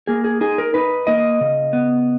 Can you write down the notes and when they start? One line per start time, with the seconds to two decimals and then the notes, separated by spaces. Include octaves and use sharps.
0.07 A#3 G#4
0.24 G#4
0.41 D#4 G#4
0.58 A#4
0.74 D#4 B4
1.07 A#3 D#5
1.41 C#3
1.73 B3